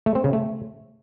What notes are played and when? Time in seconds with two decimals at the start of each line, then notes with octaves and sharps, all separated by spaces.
0.06 A3
0.15 C4
0.24 C#3
0.33 A3